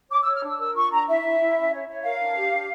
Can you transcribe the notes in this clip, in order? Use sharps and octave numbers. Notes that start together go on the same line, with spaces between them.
C#5 D6
E6
C#5
F6
D4 E6
A#4 E6
F4 C#6
D4 A#5
E4 E5
E4
E4
C#4
C#5
C#5
A#4 F5
D4
G4
D4